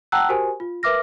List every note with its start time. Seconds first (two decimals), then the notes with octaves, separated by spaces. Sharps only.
0.12 F#5 G5 A5 A#5 E6 F#6
0.29 F#4 G4 A#4 C5 G#5
0.60 F4
0.83 A#4 B4 E5 D6 F6 A#6